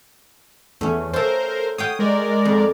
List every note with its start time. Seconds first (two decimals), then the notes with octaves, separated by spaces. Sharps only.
0.81 E2 A3 C#4
1.13 F4 A4 A#4 C5
1.78 C#5 F5 G5 D#6
1.99 G#3 A#4 D5
2.45 F2